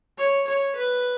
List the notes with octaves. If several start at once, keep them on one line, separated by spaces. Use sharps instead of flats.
C#5
C#5
B4